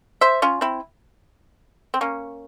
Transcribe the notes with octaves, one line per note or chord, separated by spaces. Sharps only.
C5 E5
C#4 F4
C4 E4
C4
A#3 C#4